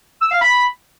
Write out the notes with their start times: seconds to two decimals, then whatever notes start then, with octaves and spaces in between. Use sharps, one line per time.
0.21 E6
0.31 F5
0.41 B5